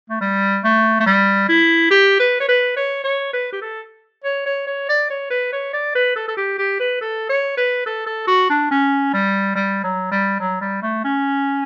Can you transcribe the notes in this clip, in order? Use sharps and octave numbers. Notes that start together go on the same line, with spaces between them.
A3
G3
A3
A3
G3
E4
G4
B4
C#5
B4
C#5
C#5
B4
G4
A4
C#5
C#5
C#5
D5
C#5
B4
C#5
D5
B4
A4
A4
G4
G4
B4
A4
C#5
B4
A4
A4
F#4
D4
C#4
G3
G3
F#3
G3
F#3
G3
A3
C#4